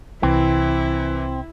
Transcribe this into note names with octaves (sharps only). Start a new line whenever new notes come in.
C2 E3 C4 E4